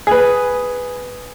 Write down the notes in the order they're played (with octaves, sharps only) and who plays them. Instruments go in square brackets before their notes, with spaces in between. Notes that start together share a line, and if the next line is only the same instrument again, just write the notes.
[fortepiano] G#4 B4